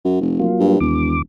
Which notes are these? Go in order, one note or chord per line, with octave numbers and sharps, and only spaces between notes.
F#2
F1
F#3 A#3 F4
G2
E1 D#2 D6